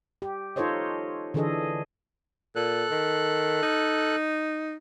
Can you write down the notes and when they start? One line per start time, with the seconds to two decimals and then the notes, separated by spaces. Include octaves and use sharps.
0.22 G4
0.56 D#4 F4 A4 C5 C#5 D#5
1.34 D3 E3 D4 G#4 A4 D#5
2.56 A#2 A4 F#6
2.91 D#3
3.63 D#4